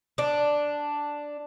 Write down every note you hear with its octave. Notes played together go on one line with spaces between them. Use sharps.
D4